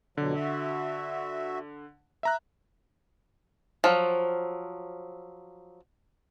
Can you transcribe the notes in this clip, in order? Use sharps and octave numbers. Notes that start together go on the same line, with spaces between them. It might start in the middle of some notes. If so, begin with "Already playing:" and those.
F2 B2 D3 F#3
F#4 E5
E5 A#5 F#6
F3 F#3